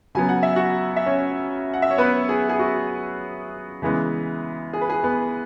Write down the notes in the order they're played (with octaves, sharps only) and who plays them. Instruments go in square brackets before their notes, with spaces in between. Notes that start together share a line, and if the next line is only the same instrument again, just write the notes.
[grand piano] C#3 F#3 B3 G#5
F#5
E5
F#4 F#5
E5
C#4 C#5
F#5
E5
C#5
B3 B4
G#4
G#4
F#4
C#3 E3 G#3 B3
G#4
B4
G#4
B3 B4